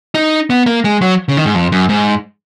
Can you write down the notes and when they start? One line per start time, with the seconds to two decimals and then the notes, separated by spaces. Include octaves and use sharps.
0.14 D#4
0.50 B3
0.66 A#3
0.84 G#3
1.02 F#3
1.28 C#3
1.37 D#3
1.46 G#2
1.55 F2
1.72 F#2
1.89 G#2